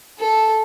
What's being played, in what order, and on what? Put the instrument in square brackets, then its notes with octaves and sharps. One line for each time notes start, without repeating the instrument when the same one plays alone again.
[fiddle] A4